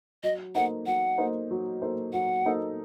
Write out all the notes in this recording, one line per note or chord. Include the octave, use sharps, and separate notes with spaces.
F#3 D#5
A#3 D#4 A4 C5 F#5
F#3 F#5
A#3 D#4 A4 C5
F#3
A#3 D#4 A4 C5
F#3 F#5
A#3 D#4 A4 C5